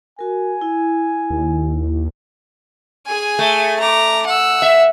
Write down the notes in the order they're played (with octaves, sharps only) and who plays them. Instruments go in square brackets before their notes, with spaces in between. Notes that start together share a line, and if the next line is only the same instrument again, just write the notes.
[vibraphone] F#4 A#4 [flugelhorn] G#5
[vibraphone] E4
[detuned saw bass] D#2
[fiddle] G#4 G#5
[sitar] A3
[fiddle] A#5 D6
F#5 E6
[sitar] E5